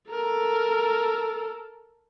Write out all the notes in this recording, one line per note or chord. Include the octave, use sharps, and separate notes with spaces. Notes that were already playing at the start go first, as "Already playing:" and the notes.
A4 A#4